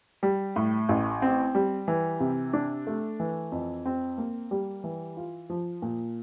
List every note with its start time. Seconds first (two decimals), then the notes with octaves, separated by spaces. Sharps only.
0.23 G3
0.56 A2
0.89 A1
1.22 C4
1.55 G3
1.88 E3
2.20 C3
2.53 D4
2.87 A3
3.20 E3
3.52 F2
3.86 C4
4.18 A#3
4.51 G3
4.84 E3
5.17 F4
5.50 F3
5.82 A#2